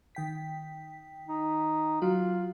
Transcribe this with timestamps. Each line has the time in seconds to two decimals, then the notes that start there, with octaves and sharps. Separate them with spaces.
0.15 D#3 G5 B6
1.29 D#4
2.02 F#3 F4 F#4